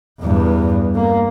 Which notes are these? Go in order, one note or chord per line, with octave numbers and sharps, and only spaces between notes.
E2 G2
A#3